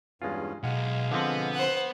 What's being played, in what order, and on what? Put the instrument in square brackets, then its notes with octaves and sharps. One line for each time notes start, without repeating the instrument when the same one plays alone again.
[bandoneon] E2 G2 C#4 [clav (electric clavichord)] G#3 F4
[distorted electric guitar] B1 [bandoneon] G#3 F5 G#5 [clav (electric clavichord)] F#5
[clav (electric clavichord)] D3 F3 C4 [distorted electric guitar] B3
[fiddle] C5 F#5